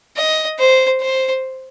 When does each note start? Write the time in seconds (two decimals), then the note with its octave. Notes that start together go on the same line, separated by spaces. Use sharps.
0.17 D#5
0.59 C5
1.01 C5